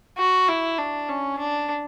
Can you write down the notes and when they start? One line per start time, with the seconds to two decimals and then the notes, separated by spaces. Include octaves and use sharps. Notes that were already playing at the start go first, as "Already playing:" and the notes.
0.18 F#4
0.48 E4
0.79 D4
1.09 C#4
1.39 D4